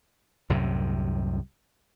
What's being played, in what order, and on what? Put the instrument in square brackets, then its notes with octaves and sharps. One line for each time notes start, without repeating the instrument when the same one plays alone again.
[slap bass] C2 F#2 A2 C3